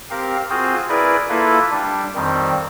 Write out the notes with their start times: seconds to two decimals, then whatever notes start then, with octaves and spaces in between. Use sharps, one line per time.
0.11 C4 G4 A#4 F5
0.50 C4 F4 F#4 G#4 C5
0.89 E4 G#4 A#4 B4 D5
1.30 A#3 E4 F4 A4 B4 E5
1.71 G3 D4
2.16 F2 D#3 G3 C4